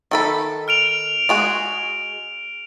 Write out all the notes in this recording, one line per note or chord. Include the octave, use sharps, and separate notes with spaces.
D#3 A4 B5
F6 D7 F7
G#3 F#4 G#4